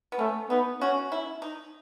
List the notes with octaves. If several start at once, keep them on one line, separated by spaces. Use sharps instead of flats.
B3
A3 C#4
B3 D#4
C#4 F#4
E4
D#4